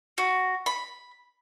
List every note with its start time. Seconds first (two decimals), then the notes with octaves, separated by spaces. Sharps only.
0.18 F#4
0.66 B5